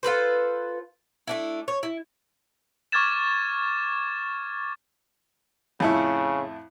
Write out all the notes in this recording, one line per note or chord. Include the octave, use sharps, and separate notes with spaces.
F4 A4 B4 C5
A3 D4 E4
C#5
E4
C#6 D6 F6 G#6 A6 E7
F2 A2 C#3 E4